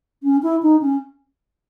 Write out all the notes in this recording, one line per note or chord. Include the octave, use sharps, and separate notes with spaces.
C#4
E4
D#4
C#4